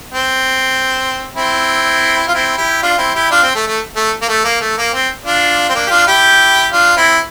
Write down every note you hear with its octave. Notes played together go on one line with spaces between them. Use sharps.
C4
C4 E4
F4
C4 E4
E4 G4
D4 F4
C4 E4
E4 G4
D4 F4
C4
A3
A3
A3
A#3
A3
A#3
A3
A#3
C4
D4 F4
C4
A#3 D4
G4
D4 F4
E4 G4
D4 F4
C4 E4